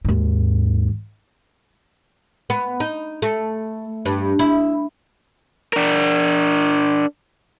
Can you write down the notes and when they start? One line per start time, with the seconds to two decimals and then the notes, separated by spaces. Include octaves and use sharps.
0.05 D#2 G#2
2.50 B3
2.80 D#4
3.22 A3
4.05 G2
4.39 E4
5.73 D4 A#4